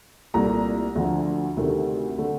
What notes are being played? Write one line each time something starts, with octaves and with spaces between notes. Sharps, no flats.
C2 A#2 A3 A#5
D2 D3 F3
D2 C3 D#3 A3
D3 A3 D4